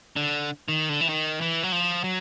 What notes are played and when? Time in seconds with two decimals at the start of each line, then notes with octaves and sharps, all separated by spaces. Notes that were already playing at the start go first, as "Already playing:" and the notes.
0.16 D3
0.69 D#3
0.89 D3
1.01 E3
1.09 D#3
1.41 E3
1.63 F#3
1.72 F3
2.04 F#3